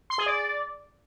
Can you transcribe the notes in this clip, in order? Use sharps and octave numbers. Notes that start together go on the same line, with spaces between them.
C6
G#4
D5